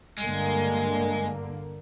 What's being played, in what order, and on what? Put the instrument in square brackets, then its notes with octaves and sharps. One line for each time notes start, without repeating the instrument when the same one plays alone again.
[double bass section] G2 D3 A#3 [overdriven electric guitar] G#3